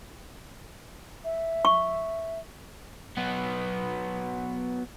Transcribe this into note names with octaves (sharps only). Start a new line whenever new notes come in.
E5
C#6
F#3 B3